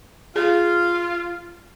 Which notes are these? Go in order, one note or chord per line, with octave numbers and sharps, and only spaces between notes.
F4 G#4